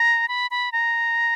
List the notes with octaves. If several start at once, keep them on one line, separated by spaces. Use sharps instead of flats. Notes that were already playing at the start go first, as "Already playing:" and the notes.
Already playing: A#5
B5
B5
A#5